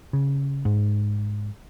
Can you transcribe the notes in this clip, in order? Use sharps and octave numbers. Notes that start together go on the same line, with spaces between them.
C#3
G#2